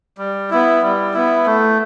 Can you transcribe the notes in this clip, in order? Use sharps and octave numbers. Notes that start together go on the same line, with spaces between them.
G3
B3 E4
G3
B3 E4
A3